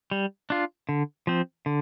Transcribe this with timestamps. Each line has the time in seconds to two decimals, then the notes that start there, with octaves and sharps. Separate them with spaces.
0.11 G3
0.50 D4 F4
0.89 D3
1.27 F3 C4
1.66 D3